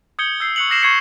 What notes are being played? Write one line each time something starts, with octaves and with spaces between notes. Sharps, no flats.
D#6 G6 G#6 C#7 G7
E6 G6 C7
C#6 D#6 F#6 C#7 F7 F#7
D6 D#6 F6 A#6 C7 E7
C#6 G#6 A#6 C7 C#7 F#7